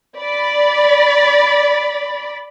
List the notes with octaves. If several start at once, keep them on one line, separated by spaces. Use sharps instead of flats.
D5 B5